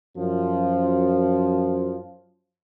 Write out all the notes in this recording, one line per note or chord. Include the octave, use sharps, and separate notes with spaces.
F#2 F3